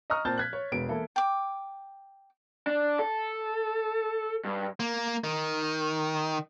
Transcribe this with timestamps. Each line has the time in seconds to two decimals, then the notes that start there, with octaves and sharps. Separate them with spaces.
0.10 D#5 A#5 C#6 D#6 F6
0.25 A#2 C4 A5 G6 A6
0.38 F#6 G#6 B6
0.53 C#5
0.72 E1 B3 D7
0.89 E3 A#3 E4 A4
1.16 G5 D6
2.67 D4
2.99 A4
4.45 G2
4.80 A#3
5.24 D#3